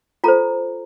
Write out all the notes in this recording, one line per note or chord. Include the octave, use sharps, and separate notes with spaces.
F4 A4 C5 A#5